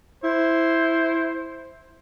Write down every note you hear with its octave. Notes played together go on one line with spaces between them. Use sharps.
E4 C5